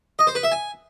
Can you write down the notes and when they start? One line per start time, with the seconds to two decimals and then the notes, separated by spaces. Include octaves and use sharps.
0.19 D#5
0.27 C5
0.35 B4
0.43 E5
0.52 G#5